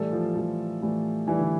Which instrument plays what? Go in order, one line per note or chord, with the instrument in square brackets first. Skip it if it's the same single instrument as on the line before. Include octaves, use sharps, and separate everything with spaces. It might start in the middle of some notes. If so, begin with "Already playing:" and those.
Already playing: [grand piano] A2 E3 G3 A3 A4
F3 F4
A2 E3 G3
A2 E3 G3
A2 E3 G3 E4
D3 D4